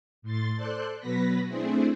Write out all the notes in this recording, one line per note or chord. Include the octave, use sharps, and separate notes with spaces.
A2 C6 A6
A4 C5 D5 C6 F#6
B2 F#3 B3 B4 A#6 B6
A3 C4 D4 E4 G#4 C5